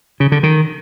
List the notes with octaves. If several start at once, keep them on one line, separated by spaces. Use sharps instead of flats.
C#3
D3
D#3